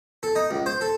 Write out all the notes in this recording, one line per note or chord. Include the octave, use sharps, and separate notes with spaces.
A4
D#4
C#2
C5
A4